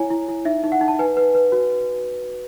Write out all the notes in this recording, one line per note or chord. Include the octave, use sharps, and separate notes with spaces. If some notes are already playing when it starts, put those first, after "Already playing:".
Already playing: E4 C#5 G#5
E4
E4
D#4 E5
D#4
F#5
D#4
A5
B4 G#5
B4
B4
F#4